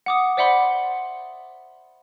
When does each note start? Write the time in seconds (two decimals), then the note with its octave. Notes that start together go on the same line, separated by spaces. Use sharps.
0.06 F#5 D6 D#6
0.37 C5 D5 E5 F#5 B5 C6